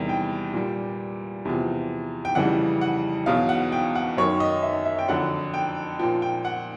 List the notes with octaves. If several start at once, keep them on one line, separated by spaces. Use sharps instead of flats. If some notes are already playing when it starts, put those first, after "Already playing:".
Already playing: E2 C3 D#3 G3
G5
A#2 G3
E2 C3 F3
G5
F2 C#3 E3 G3 F#5
F#5
E2 B2 F#3 F5
F#5
G5
F#5
F#2 D#3 F#3 C#5
D#5
E5
E5
G5
F2 D3 F#3 F#5
G5
A#2 F3 G5
G5
F#5